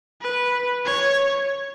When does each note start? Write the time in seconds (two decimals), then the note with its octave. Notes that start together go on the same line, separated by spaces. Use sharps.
0.22 B4
0.85 C#5